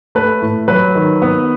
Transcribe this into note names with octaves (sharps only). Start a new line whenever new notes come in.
A3 B4
A2
F#3 B4
D#3
B3